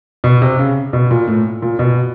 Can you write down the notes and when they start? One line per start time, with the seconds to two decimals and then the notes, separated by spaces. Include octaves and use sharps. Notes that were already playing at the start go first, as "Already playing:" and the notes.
0.24 B2
0.42 C3
0.59 C#3
0.93 B2
1.11 A#2
1.28 A2
1.62 A#2
1.79 B2